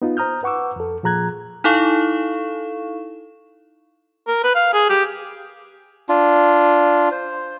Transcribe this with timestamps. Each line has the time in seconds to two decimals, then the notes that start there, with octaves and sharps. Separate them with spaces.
0.02 B3 D#4 F4
0.17 C5 A#5 D#6 F6 G6
0.43 B4 F#5 C#6 D6 E6
0.76 F2 A4
1.03 A#2 F3 G#4 A#5 F#6 G#6
1.64 D#4 E4 A4 F5 C#6 E7
4.28 A#4
4.44 B4
4.55 F5
4.74 G#4
4.90 G4
6.09 D4 F4
7.12 C5